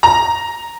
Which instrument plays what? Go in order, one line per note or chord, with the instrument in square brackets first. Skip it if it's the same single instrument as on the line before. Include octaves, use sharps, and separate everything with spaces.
[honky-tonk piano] A#5